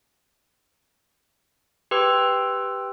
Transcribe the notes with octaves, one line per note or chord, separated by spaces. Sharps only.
G4 B4 G5 C6 E6